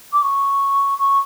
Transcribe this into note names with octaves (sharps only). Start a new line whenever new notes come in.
D6
C#6
C#6